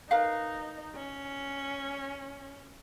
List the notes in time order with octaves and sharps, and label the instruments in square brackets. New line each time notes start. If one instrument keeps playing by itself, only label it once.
[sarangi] D#4 [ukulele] A#4 B4 F5
[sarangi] C#4